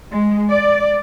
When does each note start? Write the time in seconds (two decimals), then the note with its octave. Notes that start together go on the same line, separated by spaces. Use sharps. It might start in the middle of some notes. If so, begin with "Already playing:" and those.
0.11 G#3
0.49 D5